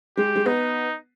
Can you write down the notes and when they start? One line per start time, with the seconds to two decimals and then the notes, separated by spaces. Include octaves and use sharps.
0.17 G#3 G4
0.36 G#3
0.46 B3 D#4